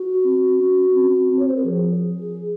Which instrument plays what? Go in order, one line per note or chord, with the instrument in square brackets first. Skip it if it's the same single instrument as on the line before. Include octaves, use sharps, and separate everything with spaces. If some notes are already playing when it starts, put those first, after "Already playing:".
Already playing: [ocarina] F#4
[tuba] C4
C#4
C4
C4
[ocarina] C#5
C5
A#4
[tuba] F3 [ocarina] G#4